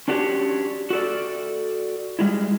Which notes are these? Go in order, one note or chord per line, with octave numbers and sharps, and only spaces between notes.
C#4 D4 F#4 G4 A#4 C#5
F#4 A4 D5
G3 G#3 E4